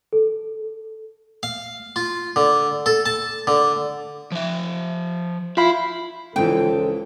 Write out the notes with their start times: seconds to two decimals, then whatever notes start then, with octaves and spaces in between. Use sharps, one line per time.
0.13 A4
1.43 F5
1.96 F4
2.36 D3
2.86 A4
3.06 A5
3.47 D3
4.32 F3 E5
5.57 E4 F4 F5 B5
6.36 C#2 G#2 D3 E3 F3 A4 G5